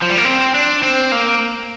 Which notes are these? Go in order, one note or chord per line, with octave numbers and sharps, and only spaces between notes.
F3
G3
A#3
C4
D4
C4
A#3